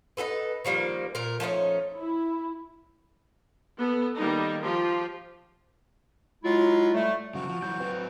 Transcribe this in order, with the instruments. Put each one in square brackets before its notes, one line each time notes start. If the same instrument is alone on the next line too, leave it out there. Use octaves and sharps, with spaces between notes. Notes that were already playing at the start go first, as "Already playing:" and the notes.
[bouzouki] D#4 G4 A4 B4
D#3 F3 G3 A#3
A#2 A#4
F3 A3 C#4 D#4
[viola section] E4
B3 A4
D#3 G3 A#3 D#4
F3 F4 G4
[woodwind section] F#3 G#3 E4 F4
A2 G3 A3
[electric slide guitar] C#3 F#3 C4 [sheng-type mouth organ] F#4
[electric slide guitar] F3
[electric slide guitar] E3 F#3 G3 [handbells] G6
[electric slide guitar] F#3 C4 [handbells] B4